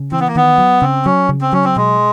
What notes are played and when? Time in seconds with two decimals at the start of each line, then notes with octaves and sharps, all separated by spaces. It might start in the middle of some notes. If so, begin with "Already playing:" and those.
Already playing: C#3
0.12 E3 C4
0.20 B3
0.28 A#3
0.35 D#3 B3
0.58 F#3
0.81 C#3 C4
1.05 F#3 C#4
1.29 C#3
1.41 C4
1.53 F#3 C#4
1.64 C4
1.76 B2 G#3